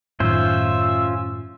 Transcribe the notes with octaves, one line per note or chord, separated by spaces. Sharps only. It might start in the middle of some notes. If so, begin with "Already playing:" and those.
F#2 A2 D#3 C#4 F4 C5 E5